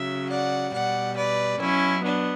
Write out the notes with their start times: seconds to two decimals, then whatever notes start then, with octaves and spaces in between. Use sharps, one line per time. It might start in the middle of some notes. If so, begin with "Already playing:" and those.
Already playing: C#3 F#3 E5
0.29 D5 F#5
0.73 B2 G3 D5 F#5
1.17 B4 D5
1.60 B2 F#3 C#4 E4
2.04 B3 D4